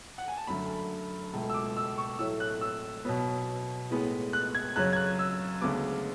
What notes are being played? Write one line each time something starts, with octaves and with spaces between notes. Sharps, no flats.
F#5
G#5
A5
F#2 D3 A3 B5
C#2 B2 A3
E6
D6
E6
C#6
A2 F#3 A3 E6
F#6
E6
B2 F#3 B3
A2 G#3 B3
F#6
G#6
F#2 C#3 F#3 F#6
G#6
F#6
E6
D2 C#3 G#3 B3 D6